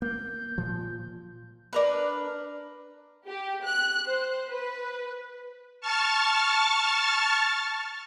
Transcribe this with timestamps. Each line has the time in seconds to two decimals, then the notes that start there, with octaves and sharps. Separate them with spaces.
0.02 A#3 G6
0.58 A#2 F3
1.73 D4 A#4 B4
3.27 G4
3.66 F#6
4.07 C5
4.51 B4
5.81 A5 C#6 F6 A6